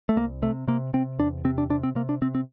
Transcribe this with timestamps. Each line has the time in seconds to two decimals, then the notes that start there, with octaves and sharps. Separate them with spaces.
0.09 A3
0.16 C2 A#3
0.42 C3 A3
0.68 C3 A#3
0.93 C3 C4
1.19 E2 D4
1.45 C3 C4
1.58 D4
1.70 C3 D4
1.83 C4
1.95 C3 A#3
2.09 D4
2.22 C3 C4
2.35 C4